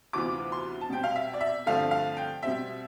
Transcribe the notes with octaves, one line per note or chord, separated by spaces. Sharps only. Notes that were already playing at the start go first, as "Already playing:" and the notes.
D2 C3 E3 B3 F4 D6
C6
A5
B2 G3 C4 G5
F5
E5
D5
E5
G2 D3 F3 A3 C4 F5
F5
G5
B2 G3 C4 E5